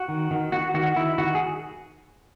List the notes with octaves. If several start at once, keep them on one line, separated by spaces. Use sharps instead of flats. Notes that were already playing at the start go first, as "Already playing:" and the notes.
Already playing: F#4
D#3
D#3
D#3 F#4
D#3 F#4
D#3 E4
D#3 F#4
G#4